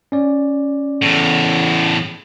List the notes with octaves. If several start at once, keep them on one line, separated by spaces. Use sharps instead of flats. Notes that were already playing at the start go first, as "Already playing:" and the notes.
C#4 D5
E2 A2